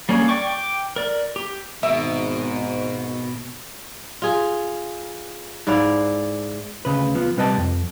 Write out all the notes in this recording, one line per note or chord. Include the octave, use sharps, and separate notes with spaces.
G3 A#3 C#4 D4 G#4
D5 G5 C#6 D6
G5 D6
A#4 D5
G4
G#1 G#2 B2 E5
F4 G#4
G#2 E4 D5 F5
D2 C#3 B4
F3 B3
C3 G3 B4 D#5 G5 A5
F2